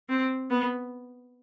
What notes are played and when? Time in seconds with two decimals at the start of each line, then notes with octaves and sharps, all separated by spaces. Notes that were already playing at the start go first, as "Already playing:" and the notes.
0.09 C4
0.50 B3